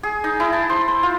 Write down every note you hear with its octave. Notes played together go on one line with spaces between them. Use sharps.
G#4
D#4
E4
A5
C5
C5
F4